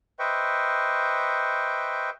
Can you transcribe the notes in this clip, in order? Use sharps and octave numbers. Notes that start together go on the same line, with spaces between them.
B4 C5 D#5 E5 G5 C#6